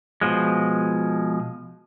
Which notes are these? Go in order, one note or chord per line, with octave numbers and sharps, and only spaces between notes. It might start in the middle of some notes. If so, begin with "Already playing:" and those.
B2 F3 G#3